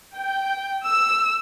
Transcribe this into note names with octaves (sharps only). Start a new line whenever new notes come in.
G5
E6